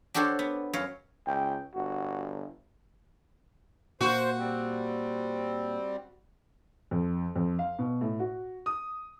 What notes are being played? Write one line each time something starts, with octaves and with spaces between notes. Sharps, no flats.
D4 F#4 G4 A4 C5 C#5
B3
F#2 C#5 F5
C#2 G5
G1 F#4
A#2 F#4 C5
G3 C4
F2
F2
F5
B2
A2
F#4
D#6